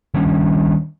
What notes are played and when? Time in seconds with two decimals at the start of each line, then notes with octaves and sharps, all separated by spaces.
0.14 D#3 G3 C#4 D4